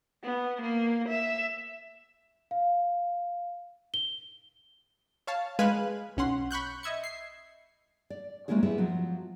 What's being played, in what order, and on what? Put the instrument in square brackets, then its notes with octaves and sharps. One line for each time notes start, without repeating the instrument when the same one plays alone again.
[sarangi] B3
A#3
E5
[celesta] F5
G7
[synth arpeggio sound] C#5 F5 A5
G#3 B4 F5 G#5 F#6 D#7
B1 C#4 F#5 C6
B5 C#6 F#6 G6
D#5 E5 G#6 C#7
C7
[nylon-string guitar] D5
G3 G#3 A#3 C#4 E4 G#4
B3 E4 G4 G#4
F3 F#3